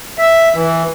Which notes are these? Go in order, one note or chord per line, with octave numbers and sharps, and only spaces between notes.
E5
E3